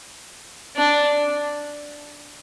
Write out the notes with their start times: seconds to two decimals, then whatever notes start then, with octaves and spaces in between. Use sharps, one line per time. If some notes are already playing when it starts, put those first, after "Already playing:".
0.76 D4